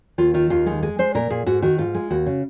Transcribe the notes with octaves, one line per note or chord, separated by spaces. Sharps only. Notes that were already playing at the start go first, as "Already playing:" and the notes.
D#2 F4
D#3 F4
D#2 F4
G#3 D#4
G#3 G#4
G#3 C5
A#2 A#4
A#2 G#4
G#2 F#4
D#3 F#4
G#2 F4
G#3
D#2 F#4
C#3